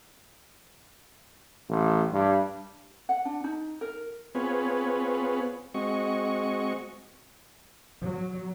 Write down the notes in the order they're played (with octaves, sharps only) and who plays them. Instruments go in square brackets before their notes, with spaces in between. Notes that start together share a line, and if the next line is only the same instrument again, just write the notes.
[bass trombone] A1
G2
[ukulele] F#5
D4
D#4
A#4
[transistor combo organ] B3 C4 F4 G#4 B4 C#5
G#3 C4 F#4 D#5 C#6
[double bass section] F#3